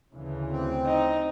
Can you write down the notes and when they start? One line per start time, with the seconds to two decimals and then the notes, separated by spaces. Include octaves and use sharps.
0.14 D2 C#3 E3
0.51 C4
0.86 D#4